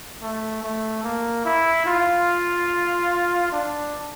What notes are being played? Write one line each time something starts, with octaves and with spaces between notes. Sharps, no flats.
A3
A3
A#3
E4
F4
D4